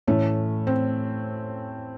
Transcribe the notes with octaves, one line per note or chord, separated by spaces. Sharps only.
A2 E3 A3 C#4
C4